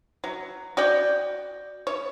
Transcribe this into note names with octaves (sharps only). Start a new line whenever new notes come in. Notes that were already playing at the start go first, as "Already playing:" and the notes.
F#3
F#4 D5 G5
C#5